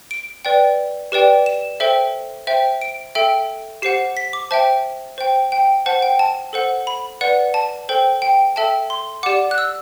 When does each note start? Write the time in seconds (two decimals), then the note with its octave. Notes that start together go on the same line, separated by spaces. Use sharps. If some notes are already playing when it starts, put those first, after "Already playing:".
0.11 D7
0.45 B4 D5 G5
1.12 G4 B4 D5 G5
1.46 E7
1.80 A4 C5 E5 G5
2.47 C5 E5 G5
2.81 D7
3.15 A4 E5 G5 D7
3.82 G4 C5 F#5 C7
4.17 B6
4.33 D6
4.51 C5 E5 G5 A5
5.18 C5 G5
5.52 G5
5.86 C5 F#5 A5
6.02 G5
6.19 A5
6.53 A4 C5 F#5
6.87 B5
7.21 B4 D5 F#5
7.54 A5
7.89 A4 C5 G5
8.22 G5
8.56 A4 E5 G5 A5
8.90 C6
9.23 G4 D5 F#5 D6
9.51 F#6
9.58 E6